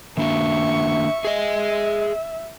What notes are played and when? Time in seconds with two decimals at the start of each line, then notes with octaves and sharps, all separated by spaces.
0.17 D#3 A#3 D4 E5 C#6
1.25 G#4 D#5 E5